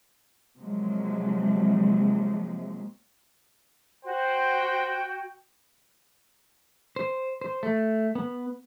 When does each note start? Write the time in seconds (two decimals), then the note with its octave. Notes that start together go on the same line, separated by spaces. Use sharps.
0.59 C3 F3 F#3 G#3 A#3
4.05 F#4 C5 G5
6.96 C5
7.41 C5
7.63 A3
8.15 B3